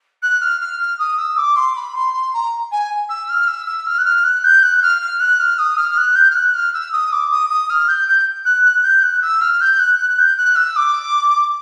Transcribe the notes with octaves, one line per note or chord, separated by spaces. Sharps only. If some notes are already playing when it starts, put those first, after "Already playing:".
F#6
F6
F6
F6
D#6
E6
D6
C6
B5
C6
C6
A#5
G#5
E6
F6
E6
E6
F6
F#6
F6
F#6
G6
F#6
F6
F6
F#6
F6
D#6
F6
F6
F#6
G6
F6
F#6
F6
E6
D#6
D6
D#6
D#6
F6
G6
G6
F#6
F#6
G6
F#6
E6
F6
G6
F#6
F#6
G6
F#6
E6
D6